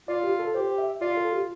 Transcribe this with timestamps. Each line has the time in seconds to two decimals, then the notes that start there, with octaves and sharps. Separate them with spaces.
0.08 F4 D5
0.24 G4
0.39 A4
0.54 G4 C5
0.78 E5
1.01 F4 D5
1.17 A4
1.33 G4